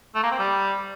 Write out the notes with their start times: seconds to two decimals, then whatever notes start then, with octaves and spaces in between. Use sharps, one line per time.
0.15 A3
0.23 A#3
0.31 C4
0.39 G3